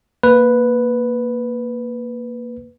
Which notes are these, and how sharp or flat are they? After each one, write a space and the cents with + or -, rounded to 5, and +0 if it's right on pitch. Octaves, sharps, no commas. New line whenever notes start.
A#3 +0 B4 +0